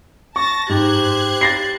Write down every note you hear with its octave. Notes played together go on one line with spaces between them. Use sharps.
A5 C#6 A6 A#6
G#2 G4 C5 F#6 G#6
A6 A#6 C7